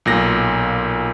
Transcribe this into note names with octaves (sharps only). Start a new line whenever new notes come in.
B1 A#2 A#6